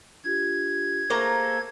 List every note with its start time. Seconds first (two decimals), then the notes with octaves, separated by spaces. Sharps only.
0.24 D4 F4 G4 G#6
1.10 A3 A#3 G#4 C5 A#5